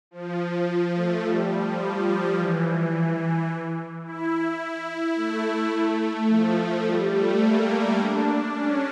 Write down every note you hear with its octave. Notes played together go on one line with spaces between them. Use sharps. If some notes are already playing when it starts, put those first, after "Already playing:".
F3
F3
A3
G3
F3
G3
F3
E3
E4
A3
A3
F3
G3
A3
A#3
D4
C#4